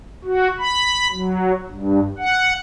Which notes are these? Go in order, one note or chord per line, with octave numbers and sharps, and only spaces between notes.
F#4
B5
F#3
G2
F#5